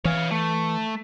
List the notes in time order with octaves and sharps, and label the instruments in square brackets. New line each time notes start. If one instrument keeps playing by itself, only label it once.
[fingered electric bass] E3 [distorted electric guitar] C#5 F5
[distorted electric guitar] A3